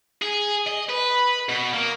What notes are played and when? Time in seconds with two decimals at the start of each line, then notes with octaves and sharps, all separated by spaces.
0.22 G#4
0.67 D#5
0.89 B4
1.49 B2
1.73 A#3